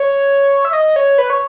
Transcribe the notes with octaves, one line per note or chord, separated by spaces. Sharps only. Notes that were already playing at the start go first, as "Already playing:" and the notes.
Already playing: C#5
E5
D#5
C#5
B4
C#5